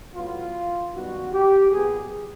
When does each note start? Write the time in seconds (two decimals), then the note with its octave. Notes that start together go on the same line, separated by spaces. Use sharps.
0.15 A2 F#3 B3 F4
0.93 F#2 D#3 G3 B3 F#4
1.33 G4
1.71 A#2 F#3 B3 G#4